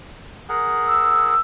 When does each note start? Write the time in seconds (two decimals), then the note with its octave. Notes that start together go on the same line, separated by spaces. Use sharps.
0.49 G#4 A#4 F#5
0.88 E6